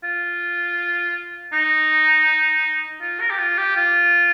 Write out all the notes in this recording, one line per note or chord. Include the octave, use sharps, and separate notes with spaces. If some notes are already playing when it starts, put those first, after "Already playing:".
F4
D#4
F4
A#4
G4
F4
G4
F4